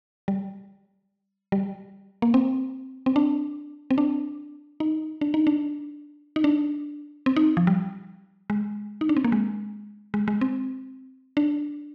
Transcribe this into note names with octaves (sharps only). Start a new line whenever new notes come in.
G3
G3
A#3
C4
C4
D4
C4
D4
D#4
D4
D#4
D4
D#4
D4
C4
D#4
F3
G3
G#3
D#4
D4
C4
A#3
G#3
G#3
G#3
C4
D4